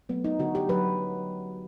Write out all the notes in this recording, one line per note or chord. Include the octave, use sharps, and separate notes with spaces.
F#3 A3 B3
D#4
D3 F#4
G4
F#3 B4